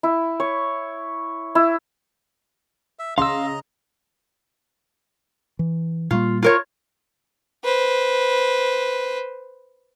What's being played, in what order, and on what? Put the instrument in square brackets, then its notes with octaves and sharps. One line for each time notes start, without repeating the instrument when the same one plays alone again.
[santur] E4
C#5
E4
[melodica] E5
[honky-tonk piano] C#3 [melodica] D#5 A#5 [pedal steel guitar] F5 E6 [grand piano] C6
[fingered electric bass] E3
[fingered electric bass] A#2 G3 A#3 [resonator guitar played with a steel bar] F4
[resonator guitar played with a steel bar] F4 A#4 C#5
[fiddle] B4 C5